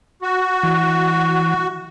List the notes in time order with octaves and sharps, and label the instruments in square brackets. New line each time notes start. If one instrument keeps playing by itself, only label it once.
[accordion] F#4
[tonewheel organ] E3